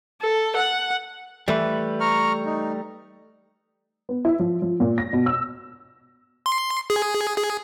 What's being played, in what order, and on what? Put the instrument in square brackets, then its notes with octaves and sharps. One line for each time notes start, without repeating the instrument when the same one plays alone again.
[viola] A4
F#5
[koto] E3 [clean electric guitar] G3 A3 B4
[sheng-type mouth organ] A#5 C#6 F6
D#4
[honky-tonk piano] B3
E4
F3
F3
A#2
A#6
B2
E6
[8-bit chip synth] C6
G#4
G#4